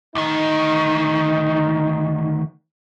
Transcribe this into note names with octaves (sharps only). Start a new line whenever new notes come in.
D2 D#3 D#4